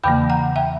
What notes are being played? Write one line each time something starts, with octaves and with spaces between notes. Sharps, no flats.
E2 C#3 E3 A#3 G5 B5
F#5 A#5
E5 G5